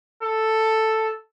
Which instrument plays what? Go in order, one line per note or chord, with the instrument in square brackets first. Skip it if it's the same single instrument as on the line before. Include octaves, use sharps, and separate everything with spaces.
[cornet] A4